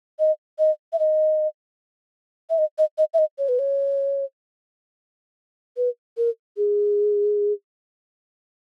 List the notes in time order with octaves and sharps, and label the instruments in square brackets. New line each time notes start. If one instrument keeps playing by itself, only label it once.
[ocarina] D#5
D#5
E5
D#5
E5
D#5
D#5
D#5
E5
D#5
C#5
B4
C#5
B4
A#4
G#4